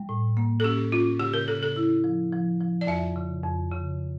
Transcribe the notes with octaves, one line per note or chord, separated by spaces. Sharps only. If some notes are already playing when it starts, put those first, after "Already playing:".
Already playing: G3
A2
A#3
A4
C#4 G4
C#4 F4
C#3 G4
A#4
C#3 A4
A4
E4
F3
F3
F3
D5
F2 E5
C#3
F2
C#3